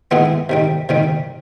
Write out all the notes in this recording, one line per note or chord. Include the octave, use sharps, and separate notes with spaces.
D#3 G#3 B3 E4 G#4
C3 D#3 G3
C3 D#3 G3